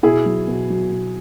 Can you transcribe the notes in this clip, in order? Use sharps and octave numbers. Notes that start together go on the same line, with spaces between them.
B2 E4 G#4
F#3
B2
F#3
B2